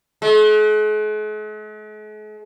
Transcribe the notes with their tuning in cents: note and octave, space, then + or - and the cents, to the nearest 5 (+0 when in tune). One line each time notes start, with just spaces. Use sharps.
G#3 +45